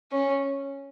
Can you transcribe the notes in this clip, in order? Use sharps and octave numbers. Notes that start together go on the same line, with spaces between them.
C#4